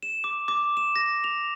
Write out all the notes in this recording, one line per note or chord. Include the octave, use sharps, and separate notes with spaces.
E7
D6
D6
E7
A#6
F7